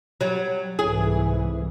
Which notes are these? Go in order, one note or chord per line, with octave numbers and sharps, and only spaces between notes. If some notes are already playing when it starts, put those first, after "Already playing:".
F#3 G3
C2 G#2 E3 G#4